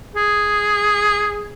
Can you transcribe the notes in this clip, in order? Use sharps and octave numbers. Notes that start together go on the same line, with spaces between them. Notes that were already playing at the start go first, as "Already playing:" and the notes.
G#4